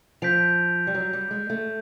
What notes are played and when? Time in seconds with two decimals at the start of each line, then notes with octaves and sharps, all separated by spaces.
0.22 F3 G6 B6 D7 F7
0.87 G3
0.94 F#3
1.13 G3
1.31 G#3
1.50 A3